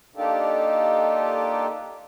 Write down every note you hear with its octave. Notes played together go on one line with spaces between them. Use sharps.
A#3 D4 D#4 F4 G4 A4